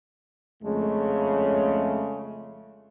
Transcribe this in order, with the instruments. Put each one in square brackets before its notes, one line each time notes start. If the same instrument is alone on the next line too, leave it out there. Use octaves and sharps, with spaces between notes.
[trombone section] F2 G#3 A3 [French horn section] C#3